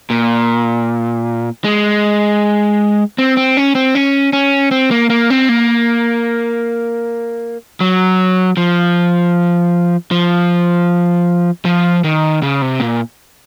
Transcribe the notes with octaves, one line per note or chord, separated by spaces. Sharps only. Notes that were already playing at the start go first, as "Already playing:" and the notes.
A#2
G#3
C4
C4
C#4
C4
C#4
C#4
C4
A#3
A#3
C4
A#3
F#3
F3
F3
F3
D#3
C#3
C3
A#2